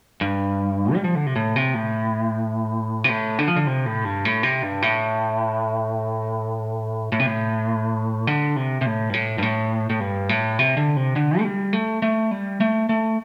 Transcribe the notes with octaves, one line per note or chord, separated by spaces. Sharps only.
G2
G3
F3
D3
C3
A2
C3
A2
C3
A2
D3
F3
D3
C3
A2
G2
A2
C3
G2
A2
A2
C3
A2
D3
C3
C3
A2
G2
A2
G2
A2
A2
G2
A2
C3
D3
C3
D3
A3
G3
A3
A3
G3
A3
A3